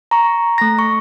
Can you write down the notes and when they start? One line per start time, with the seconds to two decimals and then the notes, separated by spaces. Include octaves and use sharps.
0.11 A#5 C#6
0.58 A3 A#6
0.79 C#6